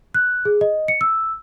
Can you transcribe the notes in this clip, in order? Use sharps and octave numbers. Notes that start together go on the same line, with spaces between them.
F#6
G#4
D#5
C#7
E6